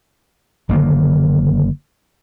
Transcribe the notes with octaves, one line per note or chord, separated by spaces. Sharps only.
F#1 D3 D#3 A#3